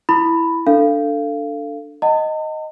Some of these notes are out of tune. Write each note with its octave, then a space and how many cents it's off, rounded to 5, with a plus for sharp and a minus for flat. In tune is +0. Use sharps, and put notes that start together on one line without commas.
E4 +0 B5 +0
D4 +0 A4 +20 F5 -20
D#5 +0 F#5 +0 A5 +45